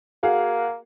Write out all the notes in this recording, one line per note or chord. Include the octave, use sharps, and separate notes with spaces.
A#3 F#4 G#4 F5